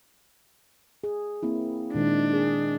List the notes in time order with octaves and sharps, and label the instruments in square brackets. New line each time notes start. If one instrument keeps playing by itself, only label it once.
[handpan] G#4
A#3 C4 E4
[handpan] A#2 D#3 G#3 [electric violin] D4
[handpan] G#4